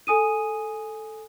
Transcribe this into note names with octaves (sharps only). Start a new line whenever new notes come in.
A4 G#5 D#6 D#7